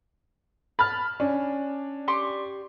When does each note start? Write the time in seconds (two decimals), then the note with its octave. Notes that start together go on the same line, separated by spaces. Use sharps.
0.79 A5 B5 F6
1.20 C#4 D4
2.08 G4 C6 C#6